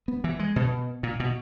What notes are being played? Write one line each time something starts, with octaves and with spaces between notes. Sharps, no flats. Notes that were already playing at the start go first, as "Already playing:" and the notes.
B3
E3
G#3
B2
A#2
B2